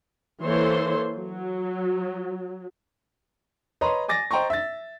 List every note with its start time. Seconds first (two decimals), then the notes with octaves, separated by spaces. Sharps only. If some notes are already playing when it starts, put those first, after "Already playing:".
0.43 E3 A#3 A4 C5 C#5 C6
1.17 F#3
3.81 B4 C#5 D#5 A#5 C6
4.08 G#5 D6 A6 A#6
4.31 C5 D#5 G5 A#5 C6 C#6
4.50 E5 A6